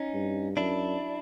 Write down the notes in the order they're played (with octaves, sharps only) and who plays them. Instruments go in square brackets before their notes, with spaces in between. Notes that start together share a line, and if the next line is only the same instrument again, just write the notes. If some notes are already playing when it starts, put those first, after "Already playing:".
Already playing: [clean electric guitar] C#4 D#4
[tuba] G2
[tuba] F#2 [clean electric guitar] D4 E4